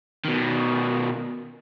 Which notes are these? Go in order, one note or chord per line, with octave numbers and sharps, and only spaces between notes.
B2 D#3